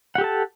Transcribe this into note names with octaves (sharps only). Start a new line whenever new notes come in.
G4 A4 F#5 A5